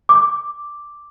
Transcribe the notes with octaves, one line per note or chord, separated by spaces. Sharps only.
D6